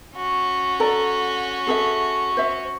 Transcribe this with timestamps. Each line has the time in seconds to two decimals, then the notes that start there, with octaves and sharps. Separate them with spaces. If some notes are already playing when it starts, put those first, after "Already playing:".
0.16 C#4 F#4
0.80 A4 D5 A#5
1.67 G#4 A4 E5
2.37 C5 E5